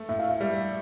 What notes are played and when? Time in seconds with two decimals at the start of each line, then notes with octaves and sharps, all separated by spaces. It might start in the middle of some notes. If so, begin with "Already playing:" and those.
Already playing: A3
0.09 A2 E5
0.19 F5
0.29 E5
0.41 G3